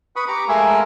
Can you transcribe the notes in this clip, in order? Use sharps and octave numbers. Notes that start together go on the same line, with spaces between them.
B4 B5 C#6 D#6
G4 A#5 C#6 D6
G#3 A3 A#4 F5 G#5 E6